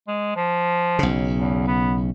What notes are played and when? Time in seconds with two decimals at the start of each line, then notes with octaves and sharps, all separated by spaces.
0.07 G#3
0.36 F3
0.99 B1 C#3
1.36 E2
1.67 B3